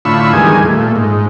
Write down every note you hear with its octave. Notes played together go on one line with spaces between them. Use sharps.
A2 D3 F4 B5 C#6 E6
E2 D#3 G3 G#3 G#5
A#2 A3
G#2